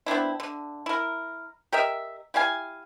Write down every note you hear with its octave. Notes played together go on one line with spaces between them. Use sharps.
B3 C4 D4 E4
D3
E4 A#4
G4 A#4 D#5 E5
E4 G4 F5 G#5